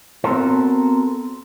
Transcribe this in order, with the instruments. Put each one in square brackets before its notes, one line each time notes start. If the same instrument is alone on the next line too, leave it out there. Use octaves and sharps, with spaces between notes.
[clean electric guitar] B3 C4 F#4 A4 A#4 C5